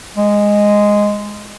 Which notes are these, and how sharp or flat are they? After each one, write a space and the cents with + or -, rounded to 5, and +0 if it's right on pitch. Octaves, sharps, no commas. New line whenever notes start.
G#3 -5